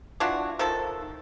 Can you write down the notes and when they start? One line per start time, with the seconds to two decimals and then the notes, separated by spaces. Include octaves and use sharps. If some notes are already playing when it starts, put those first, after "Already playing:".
0.20 E3 D4 F4 F#4
0.59 D#3 F3 A4